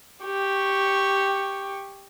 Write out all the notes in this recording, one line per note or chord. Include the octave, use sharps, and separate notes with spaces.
G4 C#6